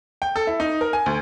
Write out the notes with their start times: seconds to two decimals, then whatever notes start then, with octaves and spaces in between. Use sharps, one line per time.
0.22 G5
0.36 A4
0.47 E4
0.60 D#4
0.81 A#4
0.93 G#5
1.06 D2